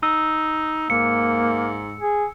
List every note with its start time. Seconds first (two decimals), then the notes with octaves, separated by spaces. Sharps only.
0.03 D#4 E6
0.90 G#2 A#3 C#7
2.00 G#4